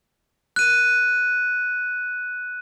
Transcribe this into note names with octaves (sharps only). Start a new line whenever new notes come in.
F#6 D#7